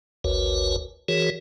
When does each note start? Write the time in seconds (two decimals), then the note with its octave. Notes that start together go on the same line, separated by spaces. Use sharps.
0.24 G#1 D2 F#4 A#4 B4 C#5
1.08 E3 F#4 G#4 A#4 C#5